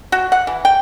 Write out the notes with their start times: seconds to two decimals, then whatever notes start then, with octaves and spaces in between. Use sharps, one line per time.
0.12 F#4
0.32 F#5
0.47 E3
0.65 G5